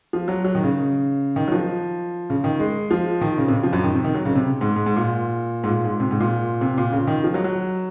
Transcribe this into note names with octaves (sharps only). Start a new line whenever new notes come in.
F3
F#3
F#3
D#3
C#3
D#3
F#3
F3
C#3
D#3
G#3
F3
D#3
C#3
C3
C#3
F3
F#2
D#3
C3
D#3
F#3
C#3
C3
G#2
G#2
G#2
A#2
G#2
A#2
G#2
C3
G#2
A#2
C3
A#2
C#3
D#3
F3
F#3
F#3